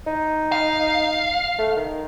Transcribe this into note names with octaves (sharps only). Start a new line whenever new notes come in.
D#4
F5
A3
D#3